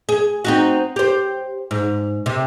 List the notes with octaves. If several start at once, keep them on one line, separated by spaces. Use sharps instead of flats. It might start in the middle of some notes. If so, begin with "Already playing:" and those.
G#4
C4 D#4 F#4
G4 C5
G#2
C3